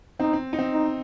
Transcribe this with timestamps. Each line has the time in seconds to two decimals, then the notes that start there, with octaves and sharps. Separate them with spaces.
0.20 C4 D#4
0.33 C4
0.53 D#4
0.59 C4
0.73 D#4